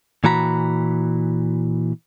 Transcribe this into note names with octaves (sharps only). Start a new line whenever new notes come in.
A#2 E3 F#4 A#5 B5